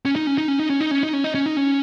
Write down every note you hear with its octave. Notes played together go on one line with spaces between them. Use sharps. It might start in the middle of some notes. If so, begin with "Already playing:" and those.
C#4
D#4
C#4
D#4
C#4
D#4
C#4
D#4
C#4
D#4
C#4
D#4
C#4
D#4
C#4